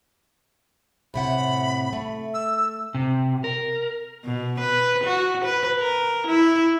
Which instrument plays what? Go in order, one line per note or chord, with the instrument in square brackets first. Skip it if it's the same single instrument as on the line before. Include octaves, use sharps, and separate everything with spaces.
[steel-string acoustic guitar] A2 C3 F#5 [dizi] B5
[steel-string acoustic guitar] A3
[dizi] E6
[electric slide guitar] C3
A#4
[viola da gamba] B2
B4
F#4
B4
A#4
E4